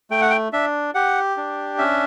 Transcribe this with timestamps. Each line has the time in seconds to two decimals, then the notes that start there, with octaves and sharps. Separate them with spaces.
0.10 A3 G5
0.21 F#5
0.30 G5
0.53 D4 E5
0.95 G4 F#5
1.37 D4
1.78 C#4 E5